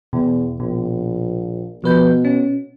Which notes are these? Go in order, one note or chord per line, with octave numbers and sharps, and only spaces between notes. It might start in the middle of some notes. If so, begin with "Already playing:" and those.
E2 B2
A#1 B2
B2 F3 B4 G6
C#4